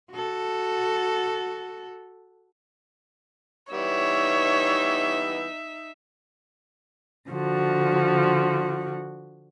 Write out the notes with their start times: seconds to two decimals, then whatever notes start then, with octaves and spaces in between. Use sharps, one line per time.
0.11 F#4 A4
3.73 E3 G3 B3 D#4 C#5 E5
7.30 D3 F3 F#4